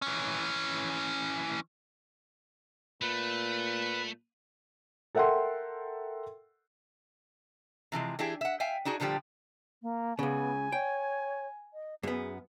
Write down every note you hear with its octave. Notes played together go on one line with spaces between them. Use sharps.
E3 C#4
A#2 A3 B4
A4 A#4 E5 F#5 G5 C6
C3 E3 F3 G#3
E3 D4 E4 G4 G#4
E5 F#5
E5 F5 G5 G#5
D4 D#4 F#4 G#4
A#2 D3 F3 G3 G4
A#3
C#2 C#3 B3 G#5
C#5 G5
D#5
F#2 B3 G#4